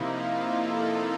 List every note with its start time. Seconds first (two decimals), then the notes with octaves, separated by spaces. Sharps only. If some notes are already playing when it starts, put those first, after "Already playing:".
Already playing: C3 F3 A#3 D#4 E4
0.13 F4
0.55 A4